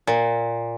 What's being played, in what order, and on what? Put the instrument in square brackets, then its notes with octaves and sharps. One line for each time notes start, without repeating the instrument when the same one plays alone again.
[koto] A#2